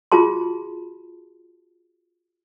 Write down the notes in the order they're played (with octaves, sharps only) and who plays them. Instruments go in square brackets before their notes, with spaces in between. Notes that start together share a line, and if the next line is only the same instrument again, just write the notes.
[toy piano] F4 F#4 G#4 A5 C6